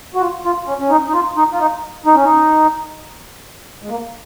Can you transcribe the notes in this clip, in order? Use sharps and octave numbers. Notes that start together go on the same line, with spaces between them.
F#4
F4
F4
C#4
C#4
D#4
D#4
F4
D#4
F4
D#4
D#4
C#4
D#4
G#3
A#3